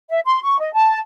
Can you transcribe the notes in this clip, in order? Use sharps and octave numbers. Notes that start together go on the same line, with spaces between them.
E5
C6
C#6
D#5
A5